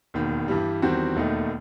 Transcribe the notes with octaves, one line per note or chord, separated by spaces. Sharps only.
E1 D#2 D#3
G2 E3 G3
E2 D#3 G3 C4 F#4
E1 D#2 D#3 A3 D#4